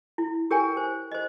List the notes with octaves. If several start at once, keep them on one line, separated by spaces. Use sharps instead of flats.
E4
G4 A#4 C#5 G5 G#5
C5
C5 D#5